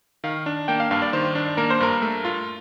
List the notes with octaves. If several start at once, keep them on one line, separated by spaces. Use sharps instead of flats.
D#3 F5
D4
A#3 G5
F5
G2 F5
D5
D#3 C5
D4
A#3 A#4
C5
G2 A#4
A3
F4